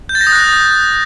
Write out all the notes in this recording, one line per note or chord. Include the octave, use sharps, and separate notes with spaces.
G6
A6
A#6
D#6
F#6